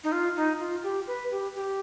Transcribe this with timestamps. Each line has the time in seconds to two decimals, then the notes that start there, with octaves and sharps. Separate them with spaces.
0.04 D#4
0.12 F4
0.36 D#4
0.60 F4
0.83 G4
1.07 B4
1.31 G4
1.55 G4